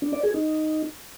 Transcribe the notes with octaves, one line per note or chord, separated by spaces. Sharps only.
D4
D5
G#4
D#4